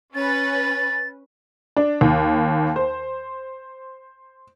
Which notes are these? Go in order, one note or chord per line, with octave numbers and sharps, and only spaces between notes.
C#4 B4 A6
D4
D#2
C5